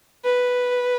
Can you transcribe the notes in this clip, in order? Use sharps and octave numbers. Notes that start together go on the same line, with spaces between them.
B4